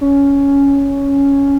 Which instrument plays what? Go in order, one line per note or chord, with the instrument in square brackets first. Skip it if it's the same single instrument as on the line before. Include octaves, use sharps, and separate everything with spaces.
[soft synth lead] C#4